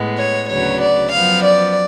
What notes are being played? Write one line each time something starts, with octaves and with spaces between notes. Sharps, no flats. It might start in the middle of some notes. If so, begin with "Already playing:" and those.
Already playing: A2 G#3 B3
C#5
D2 C#3 F#3 B3 C#5
D5
F#2 F3 B3 F5
D5